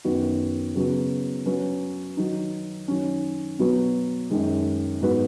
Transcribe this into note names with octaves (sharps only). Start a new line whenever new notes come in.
F#2 D#3 B3 F#4
C#3 F#3 B3 F#4
F#3 C#4 F#4 B4
D#3 F#3 D#4
D#3 F#3 C#4
B2 F#3 B3 F#4 B4
F#2 D#3 G#3
G#2 F#3 B3 F#4 B4